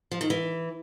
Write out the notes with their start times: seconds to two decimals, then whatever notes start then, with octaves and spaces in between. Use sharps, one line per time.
0.11 F3
0.21 D#3
0.30 E3